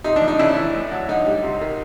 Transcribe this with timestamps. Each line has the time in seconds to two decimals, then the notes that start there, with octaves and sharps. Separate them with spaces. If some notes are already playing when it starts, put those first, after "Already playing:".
0.04 C3 D#4
0.16 D4
0.22 F3
0.28 D#4
0.39 C#3 D4 E4
0.56 E3
0.74 A2
0.91 F#3
1.09 D3 D#4
1.26 G3
1.43 C3
1.61 D#3